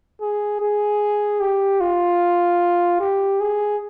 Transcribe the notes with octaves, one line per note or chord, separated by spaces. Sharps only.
G#4
G#4
G4
F4
G4
G#4